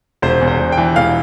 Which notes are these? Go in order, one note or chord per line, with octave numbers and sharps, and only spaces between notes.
E1 C5
E2
C5
E1
G5
E3
E1 F5